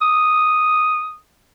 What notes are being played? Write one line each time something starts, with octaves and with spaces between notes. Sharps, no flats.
D#6